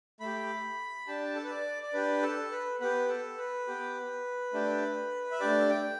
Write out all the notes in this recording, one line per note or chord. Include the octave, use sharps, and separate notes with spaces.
A3 G4 B5
D4 G4 A5
A4
B4
D5
D5
D4 G4 B4
A4
B4
B3 G4 B4
A4
B4
B3 G4
A3 D4 G4
E5
A3 D4 G4 D5
G5